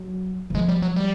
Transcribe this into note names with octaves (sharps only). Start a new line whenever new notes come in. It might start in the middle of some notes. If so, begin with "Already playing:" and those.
Already playing: F#3
E3
F3 G#3
G3
F#3
G3